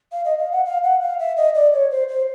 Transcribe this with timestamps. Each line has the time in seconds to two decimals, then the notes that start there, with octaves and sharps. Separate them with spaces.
0.12 F5
0.25 D#5
0.39 F5
0.52 F#5
0.65 F5
0.83 F#5
1.01 F5
1.19 E5
1.37 D#5
1.55 D5
1.73 C#5
1.91 C5
2.09 C5